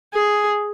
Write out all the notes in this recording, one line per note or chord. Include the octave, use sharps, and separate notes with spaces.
G#4